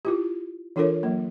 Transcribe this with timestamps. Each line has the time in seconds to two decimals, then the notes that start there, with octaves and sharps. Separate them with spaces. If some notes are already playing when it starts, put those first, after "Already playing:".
0.05 E4 F4 G4
0.76 E3 D4 F4 A4 A#4 C#5
1.03 F#3 A#3